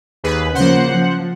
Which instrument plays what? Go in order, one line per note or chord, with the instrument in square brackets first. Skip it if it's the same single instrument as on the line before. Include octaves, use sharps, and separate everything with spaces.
[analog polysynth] D#2 G#4 B4
[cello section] C#3 F3 A#3 [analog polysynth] C5 F#5
[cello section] F3